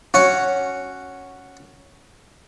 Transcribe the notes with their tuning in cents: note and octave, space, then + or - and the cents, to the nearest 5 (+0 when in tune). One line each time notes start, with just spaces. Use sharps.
C#4 +0 F#4 +0 F#5 +0